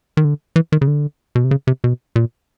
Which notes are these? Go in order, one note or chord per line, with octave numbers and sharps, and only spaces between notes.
D#3
D3
E3
D#3
C#3
D3
B2
C3
C#3
C3
B2
A#2